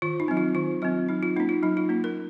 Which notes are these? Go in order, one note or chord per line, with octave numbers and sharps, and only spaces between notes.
D#3 F4
D#4
F#3 C4
F4
D#3 F4
F#3 C4 F4
F#3 D#4
F4
A#3 C#4 D#4
F4
F#3 D#4
F4
A#3 C#4
A#4